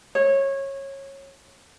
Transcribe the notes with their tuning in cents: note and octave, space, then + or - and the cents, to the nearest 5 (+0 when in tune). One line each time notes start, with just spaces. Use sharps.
C#5 -20